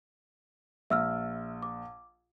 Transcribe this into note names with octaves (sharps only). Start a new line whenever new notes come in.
A#1 E5 E6 F6
D6